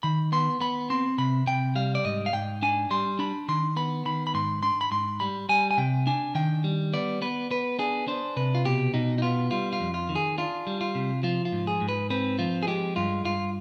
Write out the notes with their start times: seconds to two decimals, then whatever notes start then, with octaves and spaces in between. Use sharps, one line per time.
0.03 D#3 B5
0.32 B3 C6
0.61 B3 B5
0.90 C4 C6
1.18 C3 B5
1.47 C3 G5
1.75 G3 F5
1.95 D5
2.05 G#2 D#5
2.26 F5
2.33 G#2 G5
2.62 D4 G#5
2.91 G3 C6
3.19 D4 B5
3.48 D#3 C6
3.76 B3 B5
4.05 D#3 B5
4.27 B5
4.34 G#2 C6
4.63 D4 C6
4.81 B5
4.91 G#2 C6
5.20 G3 B5
5.49 G3 G#5
5.71 G#5
5.77 C3 G5
6.07 D4 G#5
6.35 D#3 G5
6.64 G3
6.93 B3 D5
7.22 B3 B4
7.51 B3 B4
7.79 D4 G#4
8.08 D4 C5
8.37 C3 B4
8.55 F4
8.65 B2 G4
8.94 B2 D#4
9.18 D#4
9.22 B3 F4
9.51 G3 F4
9.73 F4
9.80 F2
9.94 F4
10.09 D#3
10.16 G#4
10.38 D4 F4
10.67 G3
10.81 F4
10.95 C3
11.23 F3 F4
11.45 F4
11.52 G#2
11.67 G#4
11.81 G#2
11.89 B4
12.10 C4 B4
12.39 F3 F4
12.63 G#4
12.67 G#3 G4
12.96 G2 F4
13.25 G2 F4